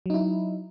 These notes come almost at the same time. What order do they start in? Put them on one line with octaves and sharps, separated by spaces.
F#3 D#4 E4